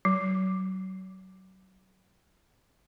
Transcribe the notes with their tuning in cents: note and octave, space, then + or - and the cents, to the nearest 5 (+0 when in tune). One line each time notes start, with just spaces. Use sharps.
F#3 +25